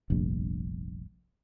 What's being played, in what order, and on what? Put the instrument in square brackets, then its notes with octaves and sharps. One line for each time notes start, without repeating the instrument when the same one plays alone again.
[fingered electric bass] F1 A#1 G2